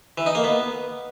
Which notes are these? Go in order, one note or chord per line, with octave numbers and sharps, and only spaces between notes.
E3
D#4
A#3
B3